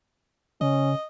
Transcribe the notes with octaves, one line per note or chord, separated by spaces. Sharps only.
C#3 C#4 D#5